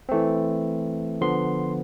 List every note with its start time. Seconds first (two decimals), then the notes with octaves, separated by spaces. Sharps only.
0.09 E3 A3 C4
1.21 D3 F3 B3 C6